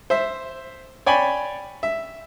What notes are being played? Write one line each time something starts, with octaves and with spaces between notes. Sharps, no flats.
C5 E5
C#5 D5 G5 G#5 B5
E5